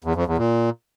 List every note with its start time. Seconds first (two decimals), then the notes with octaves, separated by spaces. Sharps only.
0.04 E2
0.16 F2
0.27 E2
0.38 A#2